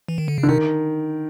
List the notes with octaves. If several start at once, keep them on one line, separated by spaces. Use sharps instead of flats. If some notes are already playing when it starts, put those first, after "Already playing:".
E3
D#3
D3
C#3
D3
C3 D#3